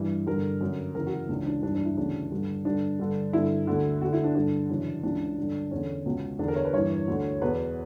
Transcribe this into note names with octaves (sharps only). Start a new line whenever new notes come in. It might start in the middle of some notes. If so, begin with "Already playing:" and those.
Already playing: G2 E3
G2 D3 A#4
F#2 D3
F#2 C#3 E3 A#4
F#4
C#2 C#3 E3 D4
D4
G2 E3 D4
D4
E4
D2 C#3 E3 D4
G2 D3
G2 D3 D4
G2 D3
G2 D3 E4
D2 D3
D2 D3 F#4
E4
D4
G2 D3 D4
F#2 C#3 E3
C#2 C#3 E3 D4
G2 D3
E2 D3 C#4
C#2 B2
E2 D3 D4
A#4
C#5
B4
G2 E3 C#5
D2 D3
E2 B2 B4